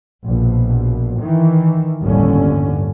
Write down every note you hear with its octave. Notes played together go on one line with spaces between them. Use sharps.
A#1 B2
D#3 E3
G1 D#2 A2 D3 C#4